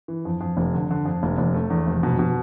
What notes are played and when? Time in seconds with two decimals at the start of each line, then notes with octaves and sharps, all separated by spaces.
0.08 E3
0.25 F2
0.41 F2
0.57 F1
0.74 D3
0.90 D3
1.05 F2
1.23 F1
1.38 F1
1.54 A3
1.70 E2
1.87 F1
2.03 B2
2.19 B2